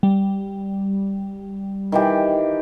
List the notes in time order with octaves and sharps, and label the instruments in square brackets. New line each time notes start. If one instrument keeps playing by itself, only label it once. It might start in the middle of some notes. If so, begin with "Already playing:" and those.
[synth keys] G3
[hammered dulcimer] D#3 E3 G4